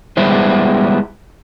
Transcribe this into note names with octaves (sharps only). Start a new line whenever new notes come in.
G3 G#3 B3 E4 C5